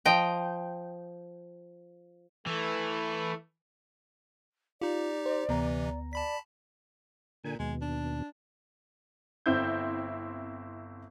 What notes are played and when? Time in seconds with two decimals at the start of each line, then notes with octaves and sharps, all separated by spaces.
0.05 F3 D#5 G5
2.47 E3 A3
4.81 D#4 F4 G4 D5
5.26 C5
5.49 D2 C3 E3 B3 A#5
6.13 D5 A5 B5 B6
7.44 A#2 D3 G#5
7.59 D#2 B2 G#3
7.81 D4
9.46 G1 C4 E4 G6